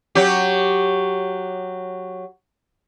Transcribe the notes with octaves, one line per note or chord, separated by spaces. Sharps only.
F#3 G4